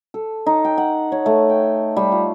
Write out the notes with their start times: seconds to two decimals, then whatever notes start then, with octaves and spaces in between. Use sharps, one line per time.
0.14 A4
0.46 D#4
0.64 G5
0.78 F#5
1.12 C#5
1.26 A3
1.49 G5
1.96 G3
2.12 F4